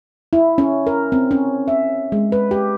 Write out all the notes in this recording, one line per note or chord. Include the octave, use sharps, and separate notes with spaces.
E4
C#4
A#4
C4
C#4
E5
G#3
B4
G4